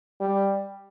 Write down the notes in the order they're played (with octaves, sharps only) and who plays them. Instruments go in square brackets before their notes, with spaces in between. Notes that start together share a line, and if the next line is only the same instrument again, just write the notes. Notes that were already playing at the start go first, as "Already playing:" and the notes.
[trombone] G3